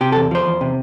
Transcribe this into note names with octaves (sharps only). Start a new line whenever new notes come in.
C3 G4
A4
E2
F3 C5
E2
C3